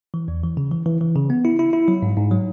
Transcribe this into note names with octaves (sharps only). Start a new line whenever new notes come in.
E3
E2
E3
C#3
E3
E3
E3
C#3
B3
E4
E4
E4
F#3
G#2
G#2
F#3